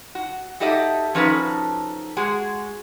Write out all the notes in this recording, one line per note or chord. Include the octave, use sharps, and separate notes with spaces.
F#4
D#4 F#4 G4 A4 D#5 E5
F3 C#4 D#4 F#4 A4 B4
G#3 F#4 G#4